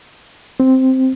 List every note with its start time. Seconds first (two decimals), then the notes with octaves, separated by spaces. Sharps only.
0.60 C4